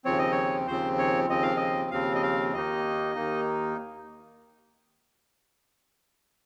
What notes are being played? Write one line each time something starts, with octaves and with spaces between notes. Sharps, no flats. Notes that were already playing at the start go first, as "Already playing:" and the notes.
D#2 C#3 F3 C4 C#5
D#5
C#5
D#2 C#3 F3 C4 C5
C#5
D#2 C#3 F3 C4 D#5
F5
D#5
D#2 C#3 F3 C4 F5
D#5
F5
D#2 D#3 A#3 D#4 D#5
D#2 D#3 A#3 D#4